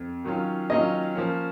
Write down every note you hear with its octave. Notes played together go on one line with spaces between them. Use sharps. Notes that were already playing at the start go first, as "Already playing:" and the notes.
Already playing: F2
D#3 F#3 C#4 F4
D#3 F#3 C#4 F4 D#5
F3 A#3 C#4